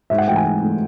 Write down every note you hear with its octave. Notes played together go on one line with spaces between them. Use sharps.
G#2 E5
F#5
E3 A3 G5
G#5
G#2
E3 A3